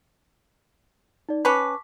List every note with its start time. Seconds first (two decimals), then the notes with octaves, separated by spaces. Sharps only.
1.29 D#4 D5
1.45 C#4 B4 A5 C#6 D6